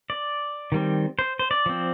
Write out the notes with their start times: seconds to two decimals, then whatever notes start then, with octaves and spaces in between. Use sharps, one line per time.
0.10 D5
0.72 D#3 G3 C4
1.19 C5
1.39 C5
1.51 D5
1.66 F3 C4